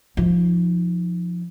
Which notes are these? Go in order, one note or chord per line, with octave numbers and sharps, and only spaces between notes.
F3 D#4